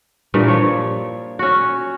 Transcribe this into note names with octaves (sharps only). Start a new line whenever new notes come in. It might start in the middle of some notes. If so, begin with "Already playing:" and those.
G2 A#2 E3
F3 C#5
C#4 F#4